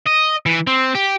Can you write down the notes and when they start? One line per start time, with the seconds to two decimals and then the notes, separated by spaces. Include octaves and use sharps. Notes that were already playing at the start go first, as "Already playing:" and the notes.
0.07 D#5
0.46 E3
0.67 C4
0.95 G4